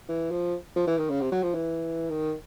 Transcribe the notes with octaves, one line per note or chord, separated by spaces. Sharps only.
E3
F3
F3
E3
D#3
C#3
C3
F#3
F3
E3
D#3